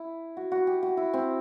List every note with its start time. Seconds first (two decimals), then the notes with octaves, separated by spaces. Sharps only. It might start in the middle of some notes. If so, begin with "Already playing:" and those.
Already playing: E4
0.37 F#4
0.52 F#4
0.67 G4
0.83 F#4
0.97 E4
1.13 C4